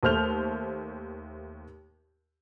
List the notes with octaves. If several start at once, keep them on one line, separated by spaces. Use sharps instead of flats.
D#2 A3 C5 F6 G6 F7